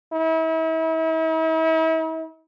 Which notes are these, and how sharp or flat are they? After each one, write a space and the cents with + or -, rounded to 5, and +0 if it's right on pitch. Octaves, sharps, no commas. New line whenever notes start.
E4 -40